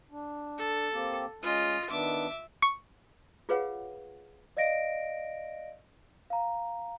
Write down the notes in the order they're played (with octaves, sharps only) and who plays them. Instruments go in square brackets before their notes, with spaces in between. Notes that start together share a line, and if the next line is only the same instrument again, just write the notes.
[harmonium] D4
[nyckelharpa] A4
[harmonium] A#3 C4 G4
[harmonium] G#3 C#4 [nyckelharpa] F4 D#5
[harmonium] D#3 B3 D4 [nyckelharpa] E5 D6
[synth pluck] C#6
[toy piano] F4 G#4 B4 C#5 F5 F#5
[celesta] D5 D#5 F5 A#6 D7
F5 A#5